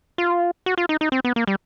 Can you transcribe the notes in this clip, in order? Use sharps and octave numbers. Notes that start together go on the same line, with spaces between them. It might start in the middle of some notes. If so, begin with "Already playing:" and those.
F4
F#4
F4
D#4
D#4
C4
B3
A#3
G3